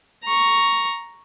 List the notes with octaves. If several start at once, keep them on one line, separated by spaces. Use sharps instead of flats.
A#5 C#6